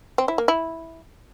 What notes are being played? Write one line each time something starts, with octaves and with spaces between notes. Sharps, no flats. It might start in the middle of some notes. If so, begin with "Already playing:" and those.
C4
E4
A#3
E4